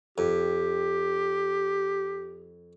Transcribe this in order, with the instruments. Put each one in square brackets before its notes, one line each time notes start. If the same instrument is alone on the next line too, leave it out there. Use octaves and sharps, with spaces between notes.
[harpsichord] F2 [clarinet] G4